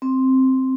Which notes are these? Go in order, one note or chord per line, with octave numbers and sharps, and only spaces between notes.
C4